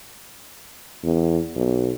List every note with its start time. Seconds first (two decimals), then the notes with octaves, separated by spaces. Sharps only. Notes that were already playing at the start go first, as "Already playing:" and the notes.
1.03 E2
1.56 B1